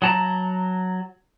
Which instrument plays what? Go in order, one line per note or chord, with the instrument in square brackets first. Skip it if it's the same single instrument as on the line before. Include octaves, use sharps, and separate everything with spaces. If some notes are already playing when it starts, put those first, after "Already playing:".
[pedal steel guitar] F#3 A5 A#5